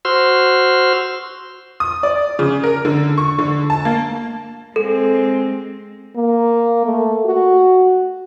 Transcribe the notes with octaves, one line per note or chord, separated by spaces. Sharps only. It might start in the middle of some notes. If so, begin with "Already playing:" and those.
F#4 C5 C6 E6 F6
D#6
D5
C#3
A#4
D3
C#6
D3
A5
A#3
G#3 C4 A4
A#3
A3
F#4